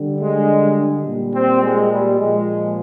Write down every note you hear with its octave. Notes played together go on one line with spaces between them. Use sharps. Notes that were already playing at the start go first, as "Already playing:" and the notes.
Already playing: D3 G3
G#3
A#2 G3
C4
G#3
G3
A#2 F3 G#3